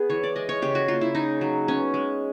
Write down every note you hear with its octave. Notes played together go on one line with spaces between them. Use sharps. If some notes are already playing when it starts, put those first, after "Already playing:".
Already playing: B3 G#4
E3 C#5
D5
G#3 D#5
C#5
C#3 G4
F#4
A#3 F4
E4
C#3 D#4
F#3
B3 C#4
G#3